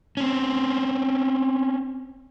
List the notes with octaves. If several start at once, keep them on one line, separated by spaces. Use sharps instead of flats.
C4 C#4